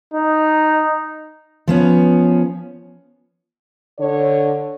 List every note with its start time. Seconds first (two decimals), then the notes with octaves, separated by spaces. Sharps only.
0.14 D#4
1.68 F3 B3 C#4
3.99 D3 C#5